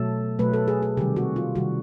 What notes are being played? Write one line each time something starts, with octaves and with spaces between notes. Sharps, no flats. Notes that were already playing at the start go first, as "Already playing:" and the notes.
Already playing: B2 F#3 A3 A4
B2 F#3 A3 B4
A4
G#4
A4
C3 D#3 G3 G4
F#4
F4
C3 D#3 G3 F#4